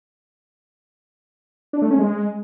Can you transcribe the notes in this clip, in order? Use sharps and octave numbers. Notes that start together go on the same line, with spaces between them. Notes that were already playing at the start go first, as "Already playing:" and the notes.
D4
A3
C#4
G#3